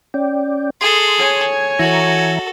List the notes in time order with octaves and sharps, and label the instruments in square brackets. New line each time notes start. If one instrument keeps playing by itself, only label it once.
[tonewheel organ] C#4 D5 G5
[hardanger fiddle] G#4 A4 [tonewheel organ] C6
[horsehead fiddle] C#5 G#5
[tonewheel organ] E3 E5 A#5 [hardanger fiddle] F#4 A4